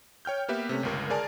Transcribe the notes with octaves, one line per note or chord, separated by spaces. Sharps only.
C#5 G5 F6 G6
A#3 B3 G4 B4 E5
C3 A3 C#4
G1 C#2 A#4
G#4 A#4 D5 G#5 A5